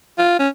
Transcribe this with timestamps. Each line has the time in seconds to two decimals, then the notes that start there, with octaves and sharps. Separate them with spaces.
0.18 F4
0.39 C#4